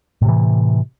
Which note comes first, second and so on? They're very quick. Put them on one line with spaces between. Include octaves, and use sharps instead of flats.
A2 C3 E3